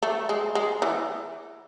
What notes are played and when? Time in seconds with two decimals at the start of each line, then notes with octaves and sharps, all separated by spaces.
0.03 A3
0.29 G#3
0.55 G#3
0.82 E3